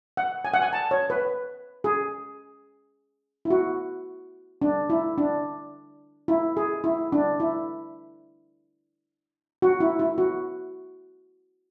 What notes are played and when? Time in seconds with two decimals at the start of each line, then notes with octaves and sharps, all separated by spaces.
0.17 F#5
0.45 G#5
0.54 F#5
0.62 G#5
0.73 A5
0.91 C#5
1.10 B4
1.84 G#4
3.45 E4
3.50 F#4
4.62 D4
4.90 E4
5.18 D4
6.28 E4
6.57 G#4
6.84 E4
7.12 D4
7.40 E4
9.62 F#4
9.80 E4
9.99 E4
10.18 F#4